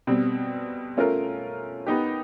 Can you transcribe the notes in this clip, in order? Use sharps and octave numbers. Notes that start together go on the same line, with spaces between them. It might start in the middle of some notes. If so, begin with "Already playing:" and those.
B2 G3 C4
A3 C#4 F4 A#4
B3 D#4 G4